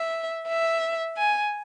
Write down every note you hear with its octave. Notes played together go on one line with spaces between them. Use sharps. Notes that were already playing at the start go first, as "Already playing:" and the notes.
Already playing: E5
E5
G#5